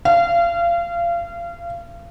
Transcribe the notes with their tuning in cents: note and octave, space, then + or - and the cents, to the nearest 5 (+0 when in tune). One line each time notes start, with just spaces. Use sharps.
F5 -30